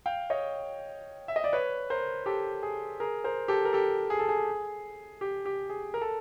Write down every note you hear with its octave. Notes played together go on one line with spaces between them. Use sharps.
F5 G5
C#5 D#5
E5
D#5
D5
B4 C#5
A#4 C5
G4 A4
G#4
G#4 A#4
A#4 C5
G4 A4
A#4
G4 A4
G#4
A4
G#4
G4
G4
G#4
A#4
A4